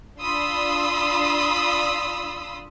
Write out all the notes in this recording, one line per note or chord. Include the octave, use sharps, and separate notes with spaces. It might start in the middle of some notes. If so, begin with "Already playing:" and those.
D4 F4 B5 C6 D#6 E6